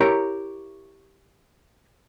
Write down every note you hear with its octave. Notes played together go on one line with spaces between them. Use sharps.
E4 G4 A#4 C#5 A#5